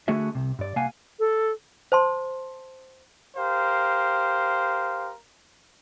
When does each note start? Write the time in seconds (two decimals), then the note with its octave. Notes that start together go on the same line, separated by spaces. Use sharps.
0.08 D3 A3 F#4 G#4 E5
0.35 C2 C3
0.59 G2 D5
0.76 C2 A#3 F5 F#5 G#5
1.19 A4
1.92 C5 A5 C6
3.36 G4 A#4 C5 F5